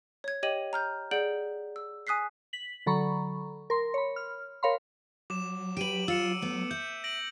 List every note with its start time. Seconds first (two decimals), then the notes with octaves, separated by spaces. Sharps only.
0.24 C#5 G#6
0.43 G4 C#5 D#5 G5 D#7 F#7
0.73 A#5 F6 G6
1.11 G#4 D5 F#5 G6 D7 F#7
1.76 E6
2.07 G#5 D#6 F#6 B6 C7
2.53 B6 F#7
2.86 D3 F#3 A4 A#5 B5 C#6
3.70 A#4 C6
3.94 C#5 B5
4.16 F6
4.63 A#4 C#5 F5 B5 C6
5.30 F#3 D6 E7
5.77 G4 B4 D7 D#7 F#7
6.08 F4 E6 C#7 E7
6.42 A3 B3
6.71 E5 G6
7.04 A#6 D7 F#7